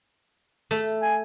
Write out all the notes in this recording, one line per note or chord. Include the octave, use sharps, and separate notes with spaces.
A3
G#5